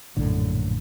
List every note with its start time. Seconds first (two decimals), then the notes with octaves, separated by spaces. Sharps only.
0.17 A#1 F#2 A2 D3